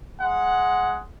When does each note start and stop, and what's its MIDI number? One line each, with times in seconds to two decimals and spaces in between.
0.21 1.01 56
0.21 1.01 78